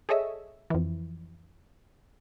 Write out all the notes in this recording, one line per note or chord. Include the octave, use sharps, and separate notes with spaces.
G#4 A4 C#5 D#5 E5
F2 E3